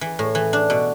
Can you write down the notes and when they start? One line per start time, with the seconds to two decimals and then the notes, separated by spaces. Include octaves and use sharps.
0.01 E3
0.19 A2
0.35 E3
0.53 D4
0.70 B2